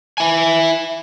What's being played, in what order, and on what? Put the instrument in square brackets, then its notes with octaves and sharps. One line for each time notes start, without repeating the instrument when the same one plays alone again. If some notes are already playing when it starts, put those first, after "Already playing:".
[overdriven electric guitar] E4 G#5